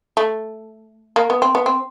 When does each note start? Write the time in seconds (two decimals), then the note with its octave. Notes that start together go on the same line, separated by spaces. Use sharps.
0.17 A3
1.16 A#3
1.30 B3
1.42 C4
1.55 B3
1.66 C4